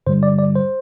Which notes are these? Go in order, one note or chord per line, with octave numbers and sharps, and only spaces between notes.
G2 D3 G3 C5
D5
D5
C5